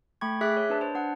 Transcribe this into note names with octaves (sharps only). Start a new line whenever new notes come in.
A3 G5 B5 C#6 G#6
G#4 E5 D6 F#6 B6
C#5
D4 B4 A5
C5 A5
D4 F#5